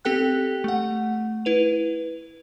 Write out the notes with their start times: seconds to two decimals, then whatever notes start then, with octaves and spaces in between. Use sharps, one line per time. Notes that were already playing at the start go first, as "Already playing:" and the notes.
0.05 C4 G4 A4 G5 F#6
0.64 A3 F#5
1.45 E4 B4 F7